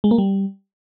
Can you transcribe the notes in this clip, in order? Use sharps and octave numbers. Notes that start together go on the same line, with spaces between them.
G#3
A#3
G3